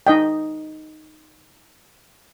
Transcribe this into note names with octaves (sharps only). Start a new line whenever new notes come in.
D#4 D#5 G5